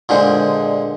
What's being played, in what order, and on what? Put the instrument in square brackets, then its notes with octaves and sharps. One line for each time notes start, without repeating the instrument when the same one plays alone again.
[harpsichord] A#2 D3 G#3 C5